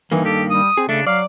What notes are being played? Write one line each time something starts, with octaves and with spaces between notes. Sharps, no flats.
G2 D#3 E3 A#3
G4 A4
G3 D#6
C4 G#4
C#3 A3 D4
F#3 D5 F5